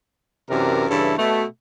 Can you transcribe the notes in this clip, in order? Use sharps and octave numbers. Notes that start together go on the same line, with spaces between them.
F#2 C3 E3 D4 A#4
G2 C#3 E3 E4 A4
B2 A3